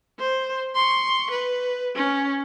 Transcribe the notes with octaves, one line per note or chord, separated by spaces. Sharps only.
C5
C6 C#6
B4
C#4